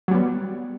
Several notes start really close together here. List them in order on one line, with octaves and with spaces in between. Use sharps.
F#3 G3 B3